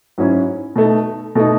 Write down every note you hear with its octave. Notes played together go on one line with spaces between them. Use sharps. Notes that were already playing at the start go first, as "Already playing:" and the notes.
G#2 F#3 C#4 E4
B2 A3 D#4
B2 A3 D#4